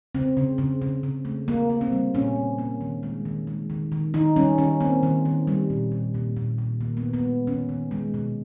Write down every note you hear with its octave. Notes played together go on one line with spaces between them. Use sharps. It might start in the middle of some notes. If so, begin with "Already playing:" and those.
C#3 C4
C#3
C#3
C#3
C#3
A3
A#3
A#3
C4
G3
A#2 C#4
A#3
A#3
D#3
G#3
D#3
G#3
D#3
D#3
D#3 D#4
G3 C#4
D#3 C#4
A#3 C4
D#3
D#3
G3
A#2
A#2
A#2
A#2
A#2
D#3 A#3
B3
D#3
B3
G#3
D#3 C#4
D#3
G#3
B2